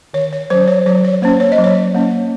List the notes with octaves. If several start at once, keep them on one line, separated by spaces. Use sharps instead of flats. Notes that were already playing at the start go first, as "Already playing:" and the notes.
D#3 C#5
C#5
F#3 C#4 C5
C#5
F#3 C#5
C#5
A#3 C#4 C5
C#5
D#5
F#3
C#5
A#3 C#4